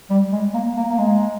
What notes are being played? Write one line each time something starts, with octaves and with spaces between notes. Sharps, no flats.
G3
G#3
A#3
A#3
A#3
G#3